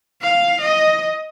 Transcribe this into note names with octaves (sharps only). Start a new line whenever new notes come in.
F5
D#5